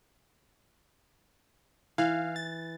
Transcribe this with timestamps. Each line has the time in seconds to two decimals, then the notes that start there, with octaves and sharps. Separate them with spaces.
1.98 E3 F5
2.36 A6